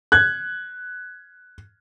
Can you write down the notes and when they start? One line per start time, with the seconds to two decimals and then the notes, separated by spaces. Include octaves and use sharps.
0.12 F#6 G#6